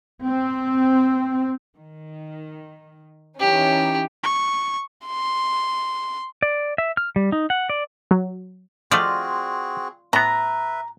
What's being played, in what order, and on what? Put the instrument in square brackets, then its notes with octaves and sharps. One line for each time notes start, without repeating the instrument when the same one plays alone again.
[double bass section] C4
[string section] D#3
[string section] E3 C#4 D#4 [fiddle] G4
[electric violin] C#6
[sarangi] C6
[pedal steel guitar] D5
E5
F6
G3
D#4
F#5
D5
[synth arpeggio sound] F#3
[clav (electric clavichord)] F3 A3 [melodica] C4 F#4 G#4 [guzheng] F4 D5 D#5
[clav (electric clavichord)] A2 B3 [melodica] B4 E5 [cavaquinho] A#5